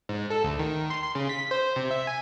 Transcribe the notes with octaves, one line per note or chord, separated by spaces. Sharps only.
G#2
A4
D2
D#3
C6
C6
C#3
B6
C5
C3
E5
G#5